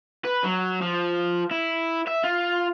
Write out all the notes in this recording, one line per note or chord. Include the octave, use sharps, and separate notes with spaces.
B4
F#3
F3
E4
E5
F4